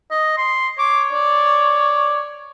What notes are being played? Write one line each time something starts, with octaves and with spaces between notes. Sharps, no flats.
D#5
C6
C#5 D6
D5